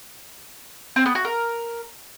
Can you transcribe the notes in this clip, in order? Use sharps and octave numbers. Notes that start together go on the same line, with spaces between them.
C4
B3
F#4
A#4